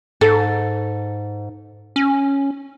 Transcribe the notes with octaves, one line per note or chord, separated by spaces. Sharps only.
G#2 A4
C#4